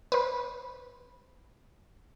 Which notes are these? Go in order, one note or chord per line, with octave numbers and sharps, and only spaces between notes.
B4 C5